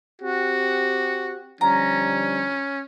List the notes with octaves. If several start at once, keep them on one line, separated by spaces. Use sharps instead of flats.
C4 F#4 G4
D3 F3 G3 C#4 A#5